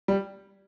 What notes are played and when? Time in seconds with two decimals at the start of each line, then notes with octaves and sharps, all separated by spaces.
0.08 G3